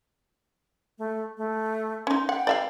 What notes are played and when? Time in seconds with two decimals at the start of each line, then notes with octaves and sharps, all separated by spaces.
0.98 A3
1.37 A3
2.07 C#4 D#4 C6
2.29 F#5 G5
2.47 D5 E5 F5